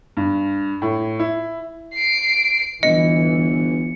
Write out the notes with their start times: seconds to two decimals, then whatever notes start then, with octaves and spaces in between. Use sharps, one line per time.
0.17 G2
0.82 A2
1.19 E4
1.93 C7 D7
2.83 G1 E3 D#5 C#7